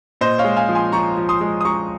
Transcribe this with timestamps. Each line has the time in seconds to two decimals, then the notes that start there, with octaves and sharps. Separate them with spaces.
0.21 A#2 C5 D#5
0.39 C#5 F5
0.44 G#3
0.57 F5 G#5
0.69 F3
0.75 G#5 C6
0.92 F3 A#5 C#6
1.17 F3
1.29 C6 D#6
1.41 G#3
1.61 D#6
1.65 G#3 A#5 C#6